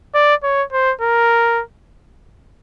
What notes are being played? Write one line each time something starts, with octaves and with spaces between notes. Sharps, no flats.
D5
C#5
C5
A#4